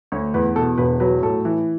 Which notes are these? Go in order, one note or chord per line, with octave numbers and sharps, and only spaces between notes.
D2 C#5
E2 B4
B2 A4
E1 B4
F#3 B4
A2 A4
E3